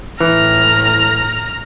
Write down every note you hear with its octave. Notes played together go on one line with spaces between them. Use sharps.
A2 E3 A#5 F6